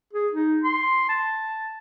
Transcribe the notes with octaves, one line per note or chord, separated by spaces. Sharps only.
G#4
D#4
C6
A5